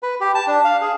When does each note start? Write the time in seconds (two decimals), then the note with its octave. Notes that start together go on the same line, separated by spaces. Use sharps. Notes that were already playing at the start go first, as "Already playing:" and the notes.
0.03 B4
0.20 G4
0.35 A5
0.47 D4
0.65 F5
0.81 G#4